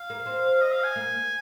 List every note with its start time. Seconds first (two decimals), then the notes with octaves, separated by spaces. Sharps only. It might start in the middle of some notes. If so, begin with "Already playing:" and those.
Already playing: F5
0.10 A#3
0.26 C4
0.61 D#5
0.72 F5
0.84 G#5
0.96 A#3